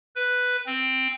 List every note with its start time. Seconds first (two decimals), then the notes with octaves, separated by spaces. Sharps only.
0.15 B4
0.66 C4